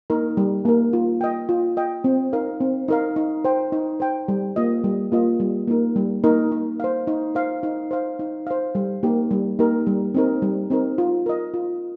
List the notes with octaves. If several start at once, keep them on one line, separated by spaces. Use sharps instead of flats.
A#3 D#4 A#4
G3
A#3 D#4 A#4
F4
D#5 G5
F4
D#5 G5
C4
D#4 A#4 F5
C4
D#4 A#4 F5
D#4
C5 G5
D#4
C5 G5
G3
A#3 F4 D#5
G3
A#3 F4 D#5
G3
A#3 D#4 A#4
G3
A#3 D#4 A#4
D#4
C5 F5
D#4
C5 F5
D#4
C5 F5
D#4
C5 F5
G3
A#3 D#4 G4 A#4
G3
A#3 D#4 G4 A#4
G3
C4 D#4 A#4
G3
C4 D#4 A#4
F4
A#4 D#5
F4